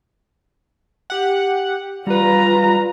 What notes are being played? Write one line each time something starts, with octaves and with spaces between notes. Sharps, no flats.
G4 F#5
G3 F4 B4 A#5